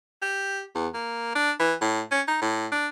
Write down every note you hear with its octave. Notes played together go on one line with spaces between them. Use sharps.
G4
E2
A#3
D4
E3
A2
C#4
D#4
A2
D4